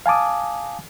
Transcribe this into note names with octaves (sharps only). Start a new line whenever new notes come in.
F5 G#5 A5 D6 D#6